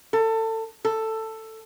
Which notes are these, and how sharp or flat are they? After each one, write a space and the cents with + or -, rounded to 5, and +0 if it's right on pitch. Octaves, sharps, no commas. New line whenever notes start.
A4 +25
A4 +10